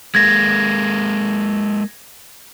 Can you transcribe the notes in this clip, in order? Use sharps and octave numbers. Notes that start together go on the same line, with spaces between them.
G#3 A#3 G#6 A#6